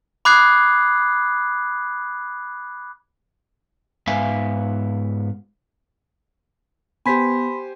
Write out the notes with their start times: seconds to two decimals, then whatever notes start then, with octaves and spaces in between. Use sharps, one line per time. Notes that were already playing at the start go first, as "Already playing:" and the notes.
0.25 B5 D6 D#6 F#6 G#6 C7
4.07 G#2 B3 E5 F5 G#5
7.06 B3 G4 C5 G#5 B5 C6 B6